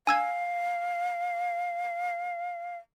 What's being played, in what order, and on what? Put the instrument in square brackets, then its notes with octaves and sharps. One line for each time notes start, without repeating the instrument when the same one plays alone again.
[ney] F5 [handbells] G#5 E6 G#6